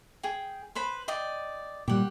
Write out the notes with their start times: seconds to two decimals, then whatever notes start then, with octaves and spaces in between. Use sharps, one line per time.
0.23 G#4 G5
0.75 B4 C5 B5
1.08 D5 D#5 G5
1.88 A#2 G3 G4 F#5